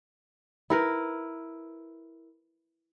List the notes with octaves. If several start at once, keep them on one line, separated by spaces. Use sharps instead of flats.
E4 A#4 B4